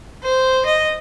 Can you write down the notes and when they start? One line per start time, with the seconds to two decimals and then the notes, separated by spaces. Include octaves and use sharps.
0.23 C5
0.65 D#5